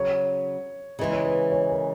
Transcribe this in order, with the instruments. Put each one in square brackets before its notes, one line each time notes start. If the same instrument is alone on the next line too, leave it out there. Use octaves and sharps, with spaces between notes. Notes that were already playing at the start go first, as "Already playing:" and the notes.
Already playing: [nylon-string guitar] C#3 F#3 [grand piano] C#5
[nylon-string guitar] C#3 E3 G#3 [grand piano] D#5
[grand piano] C#5
B4
C#5
A#4